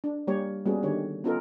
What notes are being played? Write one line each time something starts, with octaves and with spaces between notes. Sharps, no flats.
D4
G3 A#3 G4 C#5
G3 A#3 B3 C#4 F#4 G#4
D3 D#3 G4 C#5
B3 C#4 D#4 F4 A4 A#4